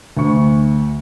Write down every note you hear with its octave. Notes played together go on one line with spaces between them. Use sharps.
D2 D3 C#6